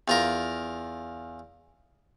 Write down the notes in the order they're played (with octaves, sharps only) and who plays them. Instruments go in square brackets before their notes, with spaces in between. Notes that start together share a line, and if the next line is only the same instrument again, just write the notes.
[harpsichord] E2 F4 A#4